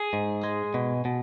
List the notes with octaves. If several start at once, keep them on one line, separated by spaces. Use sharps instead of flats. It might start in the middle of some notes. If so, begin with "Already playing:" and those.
Already playing: G#4
G#2
G#3
B2
B2